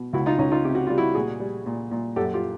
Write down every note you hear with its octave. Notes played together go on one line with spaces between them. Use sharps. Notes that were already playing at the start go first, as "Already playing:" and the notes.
Already playing: B2
C#2 E4 F#4
D#4 F4
C#2 C#4 D#4
D#4 F4
C3 G4
F#4
G3 F4
E4 F#4
A#2 F#4 G#4
G3
A#2
A#2
F#2 G4 A4
F4 G4